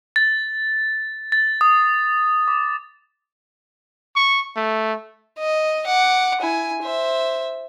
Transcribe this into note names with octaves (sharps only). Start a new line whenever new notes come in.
A6
A6
D#6
D6
C#6
A3
D#5
F#5 D6
E4 G#5
C5 E5